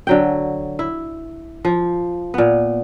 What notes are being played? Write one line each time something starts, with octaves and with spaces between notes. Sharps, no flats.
D3 F#3 G5
E4
F3
A#2 B3